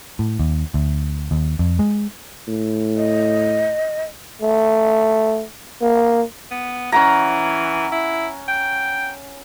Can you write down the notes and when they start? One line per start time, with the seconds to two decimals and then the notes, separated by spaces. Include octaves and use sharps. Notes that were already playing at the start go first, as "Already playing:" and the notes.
0.19 A2
0.39 D#2
0.74 D2
1.31 D#2
1.59 F2
1.79 G#3
2.48 A2
2.97 D#5
4.42 A3
5.82 A#3
6.51 B3
6.92 E3 C#4 F#5 A#5
7.92 E4
8.48 G5